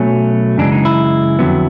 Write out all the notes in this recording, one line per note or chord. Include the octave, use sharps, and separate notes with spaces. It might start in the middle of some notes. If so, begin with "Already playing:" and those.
Already playing: B2 F#3 A3 C#4
F#2 C#3 E3 G#3 D4
D#4
E4
F2 D3 F#3 B3